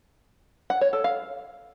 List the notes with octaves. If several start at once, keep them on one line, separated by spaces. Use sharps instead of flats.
F#5
C#5
A4
F5